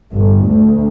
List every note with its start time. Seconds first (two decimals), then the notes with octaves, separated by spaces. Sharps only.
0.13 G1
0.47 D2